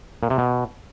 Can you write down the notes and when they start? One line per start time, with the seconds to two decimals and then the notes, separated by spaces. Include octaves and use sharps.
0.23 A#2
0.30 C3
0.38 B2